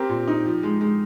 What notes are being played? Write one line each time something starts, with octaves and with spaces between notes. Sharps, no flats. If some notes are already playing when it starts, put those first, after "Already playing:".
Already playing: C4 G4 A#4
A#2
D#4
F3
G#3
G#3